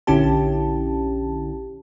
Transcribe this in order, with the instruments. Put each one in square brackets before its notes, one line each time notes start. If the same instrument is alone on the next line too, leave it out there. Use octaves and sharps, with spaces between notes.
[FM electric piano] A#1 D3 C#4 E4 G4 A5